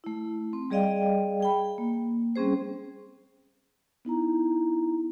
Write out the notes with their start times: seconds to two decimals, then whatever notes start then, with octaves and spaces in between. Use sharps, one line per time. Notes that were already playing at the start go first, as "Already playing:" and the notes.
0.04 A3 E4
0.53 C4
0.70 G3 G#4 D5 D#5 F5 G5
1.40 G#4 G5 B5
1.78 A#3
2.36 G3 C4 C#4 G#4 C5
4.05 B3 D#4 E4 A#5